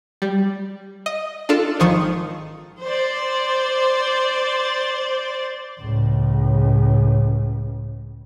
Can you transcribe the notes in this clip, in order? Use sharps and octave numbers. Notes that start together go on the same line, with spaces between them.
G3
D#5
D4 F4 A4
G#1 D#3 F3 C#6 D#6 C#7
C5 D5
C#2 A2